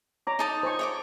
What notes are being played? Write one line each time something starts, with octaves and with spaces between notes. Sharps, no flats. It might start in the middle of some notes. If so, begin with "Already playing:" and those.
C#5 A#5 D6
D#4 A5 D#6
C5 G#5 C#6
C#5 D#5 D6